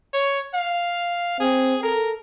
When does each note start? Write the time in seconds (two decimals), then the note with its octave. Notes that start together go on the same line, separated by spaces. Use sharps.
0.13 C#5
0.54 F5
1.40 C4 G#4
1.83 A4 A#4